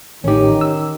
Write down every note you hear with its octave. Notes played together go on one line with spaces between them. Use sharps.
A1 D#3 C#4 D#4 G4
E6